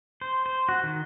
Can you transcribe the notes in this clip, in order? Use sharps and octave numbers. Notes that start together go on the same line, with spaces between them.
C5
C5
F#4
D#3